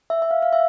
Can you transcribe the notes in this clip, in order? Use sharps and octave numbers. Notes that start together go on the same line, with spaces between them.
E5
E5
F5
F5
E5